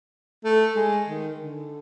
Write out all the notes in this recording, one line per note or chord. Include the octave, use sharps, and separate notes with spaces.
A3
G#3
D#3
D3